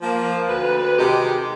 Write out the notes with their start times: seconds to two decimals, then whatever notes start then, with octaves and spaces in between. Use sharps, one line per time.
0.01 F3 A#3
0.48 D2 B4
0.97 C3 D#3 G#3 F#4 G4